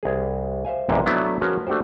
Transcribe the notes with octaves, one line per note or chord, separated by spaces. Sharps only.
C2 G#4
C5 E5 F5 G#5
A#1 E2 G#2 C3
F#3 A3 B3 D4 E4 E5
F3 C#4 F#4 G#4 A#4 B4
A3 D4 F#4 G4 C5